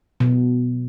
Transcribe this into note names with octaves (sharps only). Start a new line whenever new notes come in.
B2